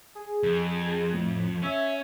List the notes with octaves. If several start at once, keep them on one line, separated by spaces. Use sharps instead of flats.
G#4
F2
A2
C#4 E5